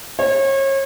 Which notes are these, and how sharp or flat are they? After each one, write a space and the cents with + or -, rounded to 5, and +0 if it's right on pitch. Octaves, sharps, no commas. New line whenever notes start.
C#5 -35